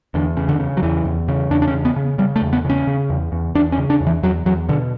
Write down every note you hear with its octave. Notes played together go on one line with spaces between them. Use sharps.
E2 D3
C#3
D3
C#3
F#3
E2 E3
E2
C#3
E2 D4
D4
C#4
C#3
B3
C#3
C#3 G3
A3
E2
B3
C#3 C#4
C#3
E2
E2
E2 D4
C#4
C#3
D4
E2
E3
E2 F#3
E2 F#3
B2 D3